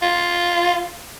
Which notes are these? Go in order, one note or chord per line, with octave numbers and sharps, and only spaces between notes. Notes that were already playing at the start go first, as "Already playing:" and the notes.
F4